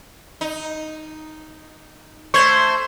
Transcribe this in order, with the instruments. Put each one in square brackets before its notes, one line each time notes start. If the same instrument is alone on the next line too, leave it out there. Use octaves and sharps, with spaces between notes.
[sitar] D#4
[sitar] A3 C5 [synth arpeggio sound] C#6 G#6